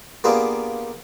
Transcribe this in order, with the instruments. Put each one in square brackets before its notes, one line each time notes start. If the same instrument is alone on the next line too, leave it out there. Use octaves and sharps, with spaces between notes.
[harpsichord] A#3 B3 D4 F4 G4 G#4